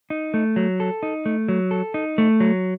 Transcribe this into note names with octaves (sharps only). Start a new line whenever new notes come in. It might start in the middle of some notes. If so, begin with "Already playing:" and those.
D#4
A3
F#3
A4
D#4
A3
F#3
A4
D#4
A3
F#3